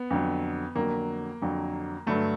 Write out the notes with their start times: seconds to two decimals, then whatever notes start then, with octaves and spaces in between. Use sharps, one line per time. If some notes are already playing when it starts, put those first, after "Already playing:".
Already playing: B3
0.10 F2 D3 F#3
0.75 F2 D3 F#3 A#3
1.42 F2 D3 F#3
2.06 G2 D3 F#3 A3